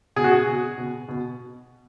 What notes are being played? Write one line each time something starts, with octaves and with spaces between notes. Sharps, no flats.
B2 G#4
F#4
G#4
B2
B2
B2